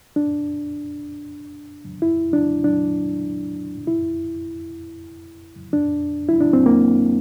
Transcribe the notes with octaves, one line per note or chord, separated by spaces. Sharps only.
D4
E4
D4
D4
E4
D4
E4
D4
C4
A#3